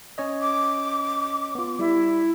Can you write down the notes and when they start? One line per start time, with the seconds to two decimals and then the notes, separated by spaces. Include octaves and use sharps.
0.18 C#4 C#5 D#5
0.41 D6
1.55 B3 F4
1.79 G3 E4